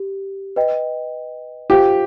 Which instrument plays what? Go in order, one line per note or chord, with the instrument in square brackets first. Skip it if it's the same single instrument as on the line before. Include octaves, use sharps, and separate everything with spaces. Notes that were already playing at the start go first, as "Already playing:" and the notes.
Already playing: [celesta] G4
B4 D#5 G5
[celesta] F4 C5 F5 [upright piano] G4